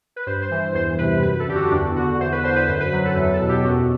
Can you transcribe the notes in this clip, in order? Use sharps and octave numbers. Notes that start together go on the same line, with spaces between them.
B4
G2 C5
C5
E3
E2 C5
C3 B4
F#2 B4
A4
D3 G4
F#4
E2 D4
D3 F#4
E2 C5
B4
D3 C5
B4
F#2 C5
B4
F#3 B4
A4
E2 B4
A4
B2
G4
F#2 F#4